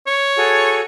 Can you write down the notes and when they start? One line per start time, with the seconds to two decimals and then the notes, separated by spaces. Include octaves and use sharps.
0.07 C#5
0.37 F#4 G#4 A4